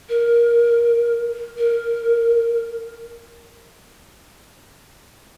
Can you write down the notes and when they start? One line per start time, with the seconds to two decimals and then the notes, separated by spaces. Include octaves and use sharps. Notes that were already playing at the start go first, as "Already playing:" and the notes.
0.09 A#4
1.58 A#4